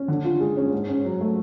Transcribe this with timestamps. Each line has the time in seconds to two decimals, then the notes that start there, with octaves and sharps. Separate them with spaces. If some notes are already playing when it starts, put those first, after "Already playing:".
Already playing: C#4
0.08 D3
0.24 F4
0.40 G#3
0.57 C#4
0.73 G#2
0.88 C#4
1.05 F#3
1.21 A3